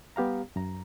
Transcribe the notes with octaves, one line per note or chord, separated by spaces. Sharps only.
G3 B3 G4 F5 A#5
F#2 A#5